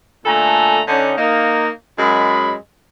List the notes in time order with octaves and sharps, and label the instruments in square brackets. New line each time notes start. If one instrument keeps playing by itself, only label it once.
[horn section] A#2 D3 A3 A4 G#5 A#5
D3 C#4 D#4
A#3 D#4
F#2 G#3 B5